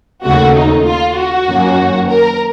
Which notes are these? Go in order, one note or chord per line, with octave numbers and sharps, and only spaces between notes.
D#2 C#3 A3 F#4
D#4
F4
F#4
F#2 D#3 A#3 C#4
A#4